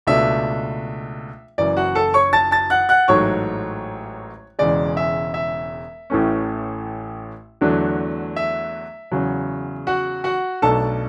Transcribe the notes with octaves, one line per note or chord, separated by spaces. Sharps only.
C#2 B2 A3 D4 E5
F#1 F#2 E3 D5
F#4 F#5
A4 A5
C#5 C#6
A5 A6
A5 A6
F#5 F#6
F#5 F#6
A1 G#2 F#3 A3 C#5 C#6
E1 E2 C#3 G#3 D5
E5
E5
A1 A2 E3 A3 C#4
E2 D3 F#3 A3 D4
E5
E2 C#3 F#3
F#4 F#5
F#4 F#5
B1 B2 A3 D4 A4 A5